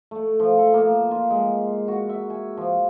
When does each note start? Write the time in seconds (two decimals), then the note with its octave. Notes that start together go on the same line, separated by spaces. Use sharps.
0.11 A3
0.40 F3
0.58 A4
0.74 A#3
1.11 F4
1.30 G#3
1.88 F#4
2.09 E5
2.30 G#5
2.57 F3